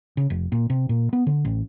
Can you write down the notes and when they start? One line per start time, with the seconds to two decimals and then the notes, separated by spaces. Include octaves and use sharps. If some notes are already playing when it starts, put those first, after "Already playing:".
0.17 C#3
0.30 F1
0.52 A#2
0.70 C3
0.89 A#2
1.13 B3
1.27 D3
1.45 A1